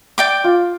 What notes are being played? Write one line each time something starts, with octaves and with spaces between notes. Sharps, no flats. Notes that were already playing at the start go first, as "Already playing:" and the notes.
D5 G5 D6
F4